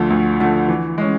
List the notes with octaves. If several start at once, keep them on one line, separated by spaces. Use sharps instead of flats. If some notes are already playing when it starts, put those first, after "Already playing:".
Already playing: D2 D3 F3 A3
D2
D3 F3 A3
E3
G#3 C#4